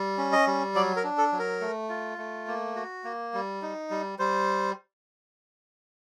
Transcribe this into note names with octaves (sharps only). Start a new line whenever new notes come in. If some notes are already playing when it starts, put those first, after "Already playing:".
Already playing: G3
C#4
D#5
G3
F#3 D5
A#4
D4
A4
F#3
A#4
A3
F4
A3
A#3
F#4
A#3
G3
D#4
G3
G3 C5